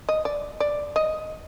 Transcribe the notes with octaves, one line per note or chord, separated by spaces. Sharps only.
D#5
D5
D5
D#5